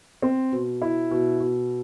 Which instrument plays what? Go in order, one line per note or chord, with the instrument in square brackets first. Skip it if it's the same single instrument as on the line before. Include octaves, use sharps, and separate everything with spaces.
[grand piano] C4
B2
E4
B2
B2